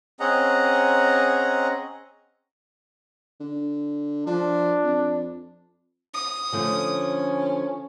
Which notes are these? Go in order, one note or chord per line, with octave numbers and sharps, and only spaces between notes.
C4 C#4 G#4 D#5 F#5 A#5
D3
F3 D4
F2
D#6
D3 F3 A3 C#4